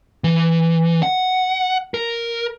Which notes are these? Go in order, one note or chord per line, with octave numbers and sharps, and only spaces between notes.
E3
F#5
A#4